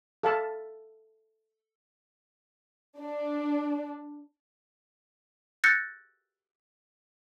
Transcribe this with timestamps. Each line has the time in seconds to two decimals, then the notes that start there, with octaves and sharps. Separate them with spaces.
0.23 A4 F5 A5
2.99 D4
5.64 E6 F#6 G6 A6 A#6 C#7